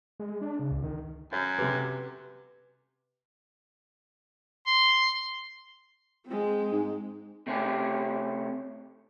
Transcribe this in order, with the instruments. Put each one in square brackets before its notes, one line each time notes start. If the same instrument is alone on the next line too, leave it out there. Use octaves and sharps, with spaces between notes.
[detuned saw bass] G#3
D4
C#3
C#2
D#3
[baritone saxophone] F#2 [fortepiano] C#5
[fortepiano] C3 G4 [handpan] B4
[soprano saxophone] C6
[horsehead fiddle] G#3 C4
[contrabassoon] G#2
[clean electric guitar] C3 A3 C#4 G4